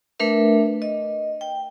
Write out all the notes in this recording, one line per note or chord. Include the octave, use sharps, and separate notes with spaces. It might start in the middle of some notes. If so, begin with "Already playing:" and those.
A3 D4 A#4 B4 E5
D#5
G5